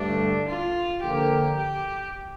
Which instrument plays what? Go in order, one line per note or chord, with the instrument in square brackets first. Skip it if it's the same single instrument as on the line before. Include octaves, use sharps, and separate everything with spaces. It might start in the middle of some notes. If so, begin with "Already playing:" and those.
Already playing: [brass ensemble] G2 D3 A3 [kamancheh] D4
[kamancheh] F4
[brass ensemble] D3 F3 A#3 [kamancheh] G4
[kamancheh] G4